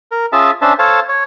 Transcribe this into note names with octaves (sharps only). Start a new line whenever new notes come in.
A#4
C#4 F4 G#4 E5 A5
C#4 D4 C5 E5 A5
A4 C5 C#5 F5 A5
C#5